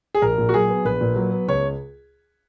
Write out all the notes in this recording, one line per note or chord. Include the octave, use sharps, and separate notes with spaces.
G#4
A#1 A#4
A#2
F#4
F#3 G#4
B3
A#1 B4
A#2
F#3
B3
C#2 C#5